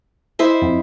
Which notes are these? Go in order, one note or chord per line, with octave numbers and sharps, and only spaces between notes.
E4 C5 D#5
F2